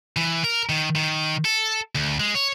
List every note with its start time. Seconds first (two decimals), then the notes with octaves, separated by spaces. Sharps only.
0.17 E3
0.44 A#4
0.69 D#3
0.95 D#3
1.45 A4
1.95 D2
2.20 G#3
2.35 C#5